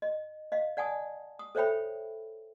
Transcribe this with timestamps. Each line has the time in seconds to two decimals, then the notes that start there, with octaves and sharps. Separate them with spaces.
0.02 D#5
0.52 D#5 F5
0.77 D5 F#5 G#5 A5 D#6
1.39 D#6
1.55 A4 C5 C#5 E5 G5 B5